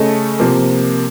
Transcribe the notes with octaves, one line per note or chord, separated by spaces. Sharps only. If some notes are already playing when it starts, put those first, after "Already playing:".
Already playing: C#3 A3 C#4 A4 D#5
C3 F3 A#3